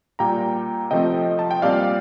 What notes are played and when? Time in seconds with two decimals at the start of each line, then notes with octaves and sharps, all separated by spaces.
0.19 A#2 G3 A#3 G5 A#5
0.91 C3 F3 A3 C4 D#5 G5
1.39 A5
1.51 G5
1.62 A#2 G3 C4 D5 F5